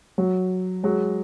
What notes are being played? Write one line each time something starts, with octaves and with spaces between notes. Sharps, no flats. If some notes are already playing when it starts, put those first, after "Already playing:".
F#3
F#3 G#3